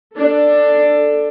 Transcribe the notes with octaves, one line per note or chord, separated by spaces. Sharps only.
D4 A4